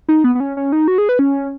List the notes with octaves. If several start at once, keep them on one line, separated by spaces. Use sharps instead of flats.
D#4
B3
B3
C#4
C#4
D#4
F#4
G#4
B4
C#4